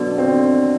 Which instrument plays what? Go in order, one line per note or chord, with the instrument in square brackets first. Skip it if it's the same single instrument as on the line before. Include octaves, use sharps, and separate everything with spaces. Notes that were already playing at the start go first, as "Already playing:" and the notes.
Already playing: [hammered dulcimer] B2 D3 [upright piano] F#3
[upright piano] C4